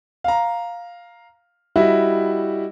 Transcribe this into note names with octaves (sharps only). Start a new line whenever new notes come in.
F5 A#5
G3 E4 F#4 D#5 E5